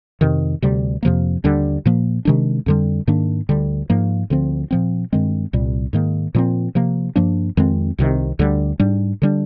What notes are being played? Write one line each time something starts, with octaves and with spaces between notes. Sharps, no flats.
F2 C3 D#3
D2 C3 G3
F2 C3 F3 A#3
D#2 D3 G3 D4
A#2 F3 A#3
C3 D#3 G#3 D4
F2 D3 G3
G#2 D#3 A#3 D4
D2 D3 G3
G#2 F3 A#3
D2 D3 F3 C4
A#2 F3 C4
G2 D#3 G#3 C4
C2 A#2 G3
G#2 D#3 A#3
A#2 F3 G#3 C4
C3 F3 A#3
G2 F3 A#3 D4
F2 D#3 G#3 C4
C2 C3 D#3
D2 D3 G3
G#2 G3 D4
D3 G3 D4